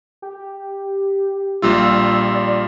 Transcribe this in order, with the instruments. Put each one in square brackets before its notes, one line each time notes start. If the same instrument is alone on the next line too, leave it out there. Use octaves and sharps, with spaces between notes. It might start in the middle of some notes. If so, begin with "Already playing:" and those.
[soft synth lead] G4
[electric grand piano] A#1 G3 F4 [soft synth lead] E6
[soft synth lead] D5